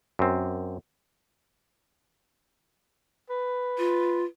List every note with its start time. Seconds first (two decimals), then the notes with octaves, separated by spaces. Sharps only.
0.19 F#2 C4
3.30 B4
3.78 F4